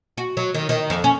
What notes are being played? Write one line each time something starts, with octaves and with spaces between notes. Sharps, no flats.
F#4
F#3
D#3
D#3
F2
C#4